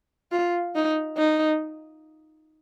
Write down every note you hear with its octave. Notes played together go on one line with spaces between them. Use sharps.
F4
D#4
D#4